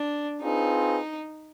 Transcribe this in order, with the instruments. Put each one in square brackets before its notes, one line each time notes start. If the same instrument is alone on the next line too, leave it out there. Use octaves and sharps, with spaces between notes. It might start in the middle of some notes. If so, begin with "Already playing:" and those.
Already playing: [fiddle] D4
[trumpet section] C4 F4 G#4 B4 [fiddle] D#4